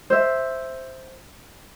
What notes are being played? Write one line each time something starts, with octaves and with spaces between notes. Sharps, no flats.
C5 E5